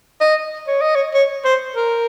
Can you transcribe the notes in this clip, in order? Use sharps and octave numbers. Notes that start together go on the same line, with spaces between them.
D#5
C#5
D#5
C#5
C#5
C5
A#4